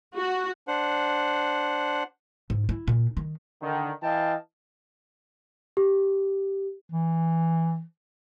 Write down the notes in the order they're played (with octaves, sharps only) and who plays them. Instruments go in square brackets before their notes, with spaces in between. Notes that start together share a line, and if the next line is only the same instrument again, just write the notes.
[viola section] F#4
[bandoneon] D4 C5 F#5
[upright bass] G#2
E4
A#2
D#3
[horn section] D3 D#3
E3 D#5 F5 G5 A5
[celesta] G4
[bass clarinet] E3